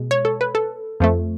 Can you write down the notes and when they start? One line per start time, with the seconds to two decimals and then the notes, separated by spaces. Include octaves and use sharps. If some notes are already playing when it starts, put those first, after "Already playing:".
Already playing: B2 G#3
0.11 C#5
0.25 A4
0.41 B4
0.55 A4
1.00 F2 F3 A3